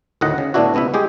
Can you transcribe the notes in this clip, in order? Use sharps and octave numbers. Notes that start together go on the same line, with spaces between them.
D2 A2 D#3 D#5 F#5
C#3
A2 D3 B3 D4 E4 F#4
C#2 C3 B3 E4 E5
G#3 G4 G#4